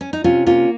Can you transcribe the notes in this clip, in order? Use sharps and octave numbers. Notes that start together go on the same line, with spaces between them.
C#4
D#4
C3 C#4 F4
A#3 C#4 F4